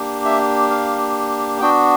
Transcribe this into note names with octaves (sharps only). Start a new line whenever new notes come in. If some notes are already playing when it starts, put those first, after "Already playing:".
Already playing: A#3 D4 G4
E5
F5
B3 D4 F#4 G5